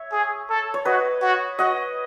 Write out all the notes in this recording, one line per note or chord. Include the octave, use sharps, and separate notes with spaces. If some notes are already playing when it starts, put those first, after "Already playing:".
Already playing: C#5 E5
G#4
A4
C#5
F#4 B4 D#5
F#4
F#4 D#5 F#5